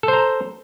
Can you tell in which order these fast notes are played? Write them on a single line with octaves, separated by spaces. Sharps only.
A4 C5 A#5